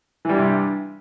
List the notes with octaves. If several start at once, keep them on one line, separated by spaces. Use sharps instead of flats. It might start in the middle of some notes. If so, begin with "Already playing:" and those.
G2 C3 E3 G3